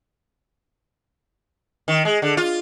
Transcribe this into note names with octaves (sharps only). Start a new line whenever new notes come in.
D#3
G#3
D3
F4